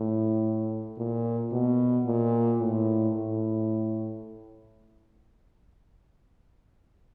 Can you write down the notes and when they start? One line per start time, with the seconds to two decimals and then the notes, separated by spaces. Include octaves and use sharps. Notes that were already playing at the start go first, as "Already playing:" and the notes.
Already playing: A2
0.98 A#2
1.52 B2
2.06 A#2
2.60 A2
3.14 A2